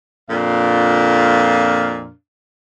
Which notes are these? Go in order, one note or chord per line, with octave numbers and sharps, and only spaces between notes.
F2 A#2 D4 F5